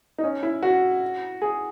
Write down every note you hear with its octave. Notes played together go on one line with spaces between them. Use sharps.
D#4
C#4
E4
F#4
G#4